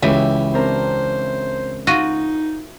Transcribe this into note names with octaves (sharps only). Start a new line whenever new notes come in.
C#2 E3 E4 G4 E5
C4 D4 A#4 C5
D#4 F4 F#4 D#5